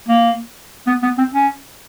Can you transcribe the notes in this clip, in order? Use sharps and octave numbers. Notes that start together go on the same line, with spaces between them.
A#3
B3
B3
C4
C#4